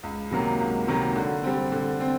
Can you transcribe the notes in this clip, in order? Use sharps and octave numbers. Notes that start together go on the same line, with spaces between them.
C#2
C3 D#3 F#3 A#3
C#2
C3 D#3 F#3 A#3
D3
G3 C4
D3
C4